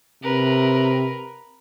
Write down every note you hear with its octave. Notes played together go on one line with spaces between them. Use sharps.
C3 A#4 B4